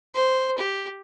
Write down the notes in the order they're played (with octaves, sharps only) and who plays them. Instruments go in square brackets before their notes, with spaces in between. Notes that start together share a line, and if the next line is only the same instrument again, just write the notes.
[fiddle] C5
G4